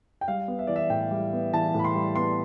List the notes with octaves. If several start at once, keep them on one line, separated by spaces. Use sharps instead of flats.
G5
G3 F5
B3
E5
E3 D5
E5
A2 G5
G3
B3
E3 A5
A2 B5
C6
G3
B3 C6